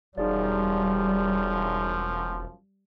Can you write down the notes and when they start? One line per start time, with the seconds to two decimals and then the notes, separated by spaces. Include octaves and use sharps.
0.18 E1 F#2 F3 G3 D#4 G#4 D5